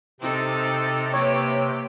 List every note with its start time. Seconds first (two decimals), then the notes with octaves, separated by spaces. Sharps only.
0.21 C3 C4 D#4 A4
1.14 A#3 G4 B4 C#5